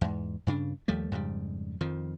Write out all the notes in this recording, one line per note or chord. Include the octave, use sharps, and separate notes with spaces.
E2 G#2
G2 C#3 D4
D#2 F3 G3 A3
F2 G#2 C#3 G3
F2 D#3 F3